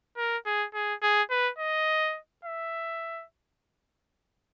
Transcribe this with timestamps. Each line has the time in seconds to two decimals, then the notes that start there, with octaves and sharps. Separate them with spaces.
0.17 A#4
0.46 G#4
0.74 G#4
1.02 G#4
1.30 B4
1.59 D#5
2.45 E5